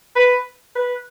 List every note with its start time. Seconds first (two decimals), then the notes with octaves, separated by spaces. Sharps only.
0.16 B4
0.76 B4